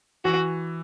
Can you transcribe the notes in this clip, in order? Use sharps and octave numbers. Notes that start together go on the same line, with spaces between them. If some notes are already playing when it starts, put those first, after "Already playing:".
E3 F#4